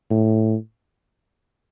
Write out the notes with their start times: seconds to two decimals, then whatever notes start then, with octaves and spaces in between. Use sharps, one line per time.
0.11 A2